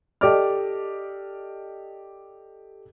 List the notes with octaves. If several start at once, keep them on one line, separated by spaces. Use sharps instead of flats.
G4 A4 D5 D#5 D6 F6